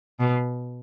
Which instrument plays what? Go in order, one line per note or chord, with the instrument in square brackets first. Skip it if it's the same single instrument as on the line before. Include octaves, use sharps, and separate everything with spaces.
[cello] B2